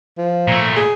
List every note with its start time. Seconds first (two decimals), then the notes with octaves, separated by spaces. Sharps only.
0.18 F3
0.48 A#2 A3
0.76 G#4